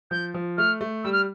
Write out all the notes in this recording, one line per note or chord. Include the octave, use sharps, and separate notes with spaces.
F3 G6
F3
A3 F6
A3
G3 E6
F6